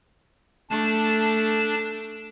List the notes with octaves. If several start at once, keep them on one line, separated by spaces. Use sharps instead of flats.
A3 D4 A5